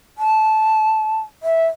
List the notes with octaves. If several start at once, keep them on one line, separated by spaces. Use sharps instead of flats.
A5
E5